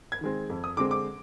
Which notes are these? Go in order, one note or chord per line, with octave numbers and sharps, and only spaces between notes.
G#6
D#3 G#3 C4
F2
D#6
D3 G#3 C4 D6
D6